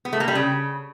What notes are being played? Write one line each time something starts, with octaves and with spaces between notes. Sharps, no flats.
B3
A3
A#3
G3
C#3